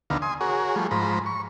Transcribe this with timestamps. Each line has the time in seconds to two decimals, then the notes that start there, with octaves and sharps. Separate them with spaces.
0.10 D2 D3 D#3 B3 F5 A#5
0.22 G#5 C6 D#6
0.41 F#4 G#4 A#4 C#5
0.76 F3 G3 A3 G#4
0.91 G#2 F3 C5 A#5 B5
1.26 C#6